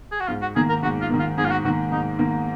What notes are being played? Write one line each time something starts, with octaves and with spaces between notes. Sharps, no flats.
G#4
F#4
G#2 F4
F#4
D#3 A#3 G#4
A#4
G#2 F#4
F4
D#3 A#3
F4
G#2 G#4
F4
F#4
D#3 A#3 F#4
G#2 D#4
D#3 A#3